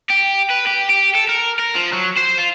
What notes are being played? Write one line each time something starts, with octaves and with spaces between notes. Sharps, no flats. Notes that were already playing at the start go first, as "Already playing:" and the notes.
G4
B4
G4
G4
A4
A#4
A#4
F3
F#3
C5
F4